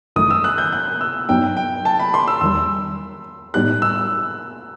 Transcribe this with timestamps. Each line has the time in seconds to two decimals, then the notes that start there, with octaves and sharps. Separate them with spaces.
0.16 G1 F#2 D#3 A3 D#6
0.30 E6
0.44 F#6
0.58 G6
0.72 F#6
1.01 E6
1.29 G2 F#3 B3 D#4 G5
1.57 G5
1.85 A5
2.00 B5
2.14 C6
2.28 E6
2.41 E2 D#3 G3 E6
3.54 A2 G3 B3 D#4 G4 F#6
3.82 E6